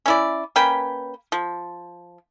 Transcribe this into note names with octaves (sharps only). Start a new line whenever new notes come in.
C#4 E4 D5
A#3 C#4 B4 G5
F3